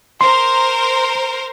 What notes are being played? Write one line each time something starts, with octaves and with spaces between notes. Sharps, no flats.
A#4 C5 C6